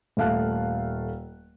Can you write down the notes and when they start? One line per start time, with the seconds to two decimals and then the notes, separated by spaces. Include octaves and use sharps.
0.17 D#1 A3 F5 A5 F#6